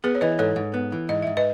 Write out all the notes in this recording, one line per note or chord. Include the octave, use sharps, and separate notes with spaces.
B3 G#4 B4
C#5
E3 B4 D#5
G#2 A4 C#5
G#2
B3
E3
G#2 D#5
G#2 E5
B4 D#5